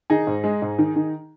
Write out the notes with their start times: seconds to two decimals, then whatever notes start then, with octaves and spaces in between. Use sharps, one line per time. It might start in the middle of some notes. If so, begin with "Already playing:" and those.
0.10 D#3 D#4 G#4
0.27 G#2
0.44 G#3
0.62 G#2
0.78 D#3
0.96 D#3